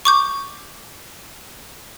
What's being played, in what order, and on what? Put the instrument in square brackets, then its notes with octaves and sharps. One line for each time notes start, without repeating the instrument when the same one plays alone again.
[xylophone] C#6 D6 G6